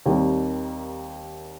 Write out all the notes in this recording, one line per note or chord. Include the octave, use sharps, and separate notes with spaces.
D#2 D#3 G3 C4 D#4